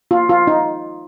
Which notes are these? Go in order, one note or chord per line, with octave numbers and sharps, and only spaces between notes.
F4
F4
D#4